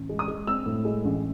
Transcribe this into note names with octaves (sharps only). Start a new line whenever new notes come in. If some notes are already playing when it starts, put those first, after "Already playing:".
Already playing: A1
G#3
D#6
G#3
C4 E6
A2
G#3
A1